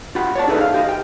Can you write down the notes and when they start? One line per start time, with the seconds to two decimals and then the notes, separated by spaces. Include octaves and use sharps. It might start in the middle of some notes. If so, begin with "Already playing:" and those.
0.15 F4 G4 F#5 B5
0.35 C#5 D5 A5
0.48 D#4 G#4 A4 B4 E5
0.61 F5
0.74 G4 D#5
0.89 G5